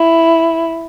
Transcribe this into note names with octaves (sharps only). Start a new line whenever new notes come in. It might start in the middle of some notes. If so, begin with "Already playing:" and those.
Already playing: E4